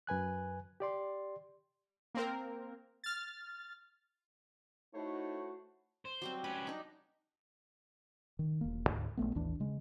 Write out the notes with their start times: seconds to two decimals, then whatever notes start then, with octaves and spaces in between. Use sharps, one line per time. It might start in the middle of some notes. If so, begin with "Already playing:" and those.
0.07 F#2 B4 G#5 F#6
0.80 G4 D5 C6
2.15 A#3 C4 A#4
3.04 F6 A6
4.94 A3 D#4 E4 F#4 C5 C#5
6.05 C5
6.22 F#3 G3 C4
6.44 C#4 B4 B5
6.67 D4 D#4
8.39 D#3
8.61 E1 A#3
8.87 D2 G#2
9.17 A#1 G2 A3 B3
9.35 A1 D#2 E3 D4
9.60 C#3 G#3